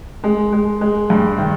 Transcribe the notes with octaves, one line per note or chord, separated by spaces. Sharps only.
G#3
G#3
G#3
G2
D#3